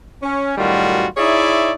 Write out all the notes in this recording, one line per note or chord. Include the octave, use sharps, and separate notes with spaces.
C#4
F#2 A2 D#3 G3 F4 F#4
D#4 E4 G#4 C#5 D5 E5